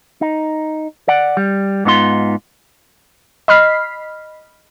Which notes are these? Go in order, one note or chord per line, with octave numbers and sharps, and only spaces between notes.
D#4
D5 F#5
G3
G#2 B3 D#4 F4 F#4 C6
D#5 B5 F6 B6 C7